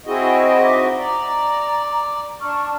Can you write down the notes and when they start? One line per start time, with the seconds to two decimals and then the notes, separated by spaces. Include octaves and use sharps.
0.06 C4 E4 F#4 G#4 D#5 G5
0.61 D#4 E5 D6
0.98 D5 A#5
2.41 D4 A5 C#6 F6